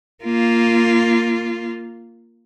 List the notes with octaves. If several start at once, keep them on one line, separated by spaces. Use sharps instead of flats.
A#3 F4